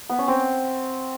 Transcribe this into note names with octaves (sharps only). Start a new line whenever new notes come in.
B3
C#4
C4